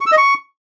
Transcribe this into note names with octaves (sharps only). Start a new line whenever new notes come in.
C#6
E6
D#5
C#6